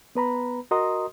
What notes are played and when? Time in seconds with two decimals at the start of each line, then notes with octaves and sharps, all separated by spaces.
0.15 B3 B4 A#5 B5
0.71 F#4 A#4 D#5 A#5 C6 D#6